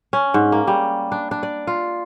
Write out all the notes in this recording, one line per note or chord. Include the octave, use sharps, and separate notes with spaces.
C#4
G#2
A#3
G3
D4
D4
D5
F4